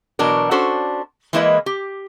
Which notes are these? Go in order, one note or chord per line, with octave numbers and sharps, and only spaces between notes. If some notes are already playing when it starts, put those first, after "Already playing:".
B2 E3 F#3 D4 A#4
C#4 D4 F#4 A4 C5
E3 G#3 A#3 E4 B4 D#5
G4